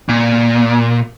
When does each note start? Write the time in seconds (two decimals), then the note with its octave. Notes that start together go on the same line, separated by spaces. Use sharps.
0.09 A#2